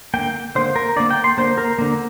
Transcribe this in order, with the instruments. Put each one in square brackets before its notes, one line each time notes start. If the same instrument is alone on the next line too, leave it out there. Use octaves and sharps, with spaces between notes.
[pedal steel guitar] D3 A#3 G5
D3 A#3 C5
A#4
D3 A#3 D5
G5
C6
D3 A#3 C5
A#4
D3 A#3